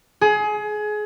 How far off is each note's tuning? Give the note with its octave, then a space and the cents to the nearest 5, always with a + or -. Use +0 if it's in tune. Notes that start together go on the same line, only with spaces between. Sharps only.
G#4 +25